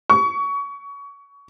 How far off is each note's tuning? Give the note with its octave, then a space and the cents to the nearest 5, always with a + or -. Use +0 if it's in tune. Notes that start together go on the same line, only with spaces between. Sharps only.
C#6 +25